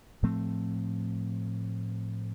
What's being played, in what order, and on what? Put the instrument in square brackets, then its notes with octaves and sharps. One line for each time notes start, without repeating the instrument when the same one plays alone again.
[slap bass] A2 F3 A3 C4